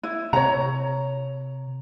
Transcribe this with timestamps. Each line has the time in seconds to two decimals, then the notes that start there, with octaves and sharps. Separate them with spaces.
0.03 E4
0.33 C3 C#5 A#5